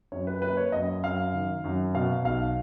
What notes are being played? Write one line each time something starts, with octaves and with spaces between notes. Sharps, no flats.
F#2 C#5
B4
A#3 B4
C#5
F#2 D#5
F#2 F5
D#3
F#2
B2 F5
B1 F5